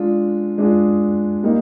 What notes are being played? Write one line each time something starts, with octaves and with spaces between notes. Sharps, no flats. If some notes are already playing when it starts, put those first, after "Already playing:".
Already playing: G#3 D4 F4 G#4
G#3 D4 F4 G#4
G3 A#3 D#4